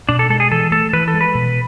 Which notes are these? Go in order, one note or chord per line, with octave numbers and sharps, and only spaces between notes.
B2 D4
A4
G#3 A4
G#4
E3 A4
A3 A4
E3 B4
A4
G#3
B4
B2